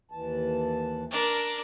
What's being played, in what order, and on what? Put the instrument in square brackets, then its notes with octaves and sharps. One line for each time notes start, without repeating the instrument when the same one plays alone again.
[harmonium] D#2 E3 A5
[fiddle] D4 A#4